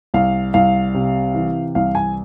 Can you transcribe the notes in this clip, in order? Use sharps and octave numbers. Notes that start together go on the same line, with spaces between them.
C2 F5
C2 F5
C3
E3
C2 F5
G#5